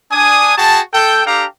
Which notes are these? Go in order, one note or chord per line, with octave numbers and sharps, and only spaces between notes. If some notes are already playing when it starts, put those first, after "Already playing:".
D4 G#5 D#6
F#4 G#4 G5 A5
A4 G5
D4 G4 A4 F5 G5 A#5